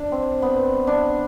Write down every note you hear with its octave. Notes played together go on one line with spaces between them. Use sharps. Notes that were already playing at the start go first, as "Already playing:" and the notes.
Already playing: D4
C4
B3
D4